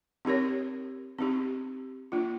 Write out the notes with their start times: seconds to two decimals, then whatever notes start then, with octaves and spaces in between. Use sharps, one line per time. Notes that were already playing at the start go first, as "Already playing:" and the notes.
0.25 C4 D#4 G4 A#4 C#5
1.18 C4 D#4 G4
2.12 A#3 D4 F4